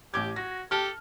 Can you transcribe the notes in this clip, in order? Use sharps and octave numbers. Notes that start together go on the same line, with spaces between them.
A1 G4 D6 G#6
F#4 A#6
G4 A4 A5 F6